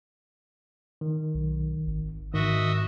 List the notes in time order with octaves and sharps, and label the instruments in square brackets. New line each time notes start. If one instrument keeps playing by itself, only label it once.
[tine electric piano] D#3
[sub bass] B1
G#1
[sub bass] G#2 [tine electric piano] D#3 [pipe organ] F#4 D#5 E5